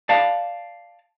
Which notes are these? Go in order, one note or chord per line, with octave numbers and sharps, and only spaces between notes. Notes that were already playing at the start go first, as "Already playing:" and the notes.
D5 F5 A5